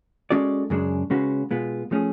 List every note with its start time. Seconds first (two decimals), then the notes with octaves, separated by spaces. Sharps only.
0.30 G#3 C#4 F#4 A4 D5
0.70 F#2 C#3 G#3 D4
1.10 C#3 G#3 C#4 F#4 B4
1.51 B2 G#3 B3 F4
1.91 F3 A3 C#4 G#4